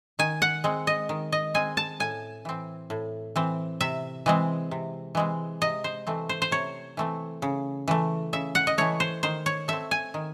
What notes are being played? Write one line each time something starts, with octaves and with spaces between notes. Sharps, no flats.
D#3 G#5
F#5
G#3 C4
D#5
D#3
D#5
G#3 C4 G#5
A5
A2 G#5
E3 C4
A2
E3 C4
C3 E5
E3 G#3 C4
C3
E3 G#3 C4
C3 D#5
C5
E3 A3 C4
C5
C5
C3 C#5
E3 A3 C4
C#3
E3 A3
C#3 E5
F#5
D#5
E3 A3 C#5
C5
D#3 C5
C#5
A3 C4 E5
G#5
D#3